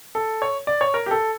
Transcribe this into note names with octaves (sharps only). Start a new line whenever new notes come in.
A4
C#5
D5
C#5
A#4
G4
A4